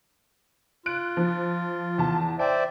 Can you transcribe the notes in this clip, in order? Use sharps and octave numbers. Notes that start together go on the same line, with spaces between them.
F4 F#6 D7
F3
E2 A5
C5 D5 E5 G5